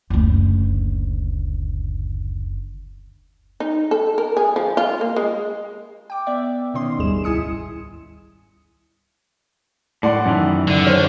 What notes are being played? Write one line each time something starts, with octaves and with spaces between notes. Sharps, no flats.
F#1 D2
D#4
A4
A#4
G#4
F3
F4
A#3
G#3
G5 D6
B3 D5 E5
B2 D#3 B3 C#4 D#5 C6
G1 D#2 G#2 G3 G#4 E7
C#2 E4 G#5 D#6 C#7
A2 D5 F#5 C6
F#2 D#3 E3
D3
C5 C#5 F6